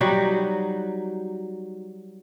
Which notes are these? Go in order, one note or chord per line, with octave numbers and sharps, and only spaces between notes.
F#3 G3 D#4 F#4